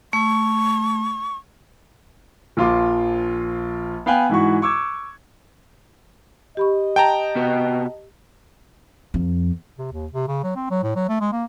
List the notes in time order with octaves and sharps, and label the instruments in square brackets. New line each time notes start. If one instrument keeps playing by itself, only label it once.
[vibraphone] A3 [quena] C#6
[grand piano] A#1 F3 F4 C6 D6
B3 F5 G5 G#5 F#6
G#2 E3 F#4 C#6
C#6 D6 E6 G#6
[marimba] G4 B5 C#6 [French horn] D#5
[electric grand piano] G5 A5 A#5
[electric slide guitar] C3 B3 F#4
[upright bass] F2
[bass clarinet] C3
D#2
C3
C#3
F#3
C4
F#3
A2
F#3
A3
G#3
A#3